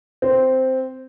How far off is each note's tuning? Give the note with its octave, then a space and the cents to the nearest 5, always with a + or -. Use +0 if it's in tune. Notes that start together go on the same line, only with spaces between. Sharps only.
C4 -5